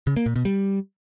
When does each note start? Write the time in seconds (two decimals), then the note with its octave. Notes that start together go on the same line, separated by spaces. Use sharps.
0.07 C#3
0.16 A#3
0.26 A#2
0.36 B2
0.45 G3